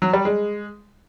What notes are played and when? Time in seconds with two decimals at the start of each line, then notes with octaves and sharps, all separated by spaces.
0.02 F#3
0.13 G3
0.25 G#3